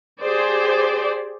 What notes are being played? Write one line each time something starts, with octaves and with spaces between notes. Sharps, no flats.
G4 G#4 C5 D5